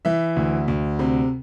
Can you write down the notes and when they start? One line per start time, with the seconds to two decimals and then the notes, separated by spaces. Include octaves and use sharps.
0.05 E3 E5
0.36 D2
0.68 D2
0.99 C3